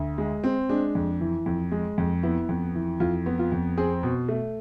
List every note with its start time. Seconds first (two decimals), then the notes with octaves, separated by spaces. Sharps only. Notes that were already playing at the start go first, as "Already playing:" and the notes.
Already playing: D2
0.18 G#3
0.44 C4
0.69 G#3 D4
0.95 F2
1.21 E3
1.46 F2
1.71 G#3
1.98 F2
2.23 B3 E4
2.49 F2
2.75 E3
3.00 F2 F4
3.26 B3
3.39 F4
3.52 F2
3.77 C4 G#4
4.03 B2
4.29 A3